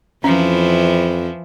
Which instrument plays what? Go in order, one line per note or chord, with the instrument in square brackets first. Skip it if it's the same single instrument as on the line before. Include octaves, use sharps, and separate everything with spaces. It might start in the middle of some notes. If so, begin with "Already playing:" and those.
[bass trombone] F2 [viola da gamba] E3 F3 E4 [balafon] C#4